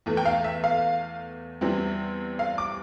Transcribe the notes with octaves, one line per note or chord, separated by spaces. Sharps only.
E2 E3 A3
G5
F5
E5
F5
E2 E3 G3 C4 E4
F5
D6